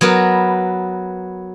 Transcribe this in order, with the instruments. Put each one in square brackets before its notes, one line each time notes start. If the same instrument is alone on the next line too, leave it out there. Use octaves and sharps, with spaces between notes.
[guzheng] F#3 B3 A#4 B4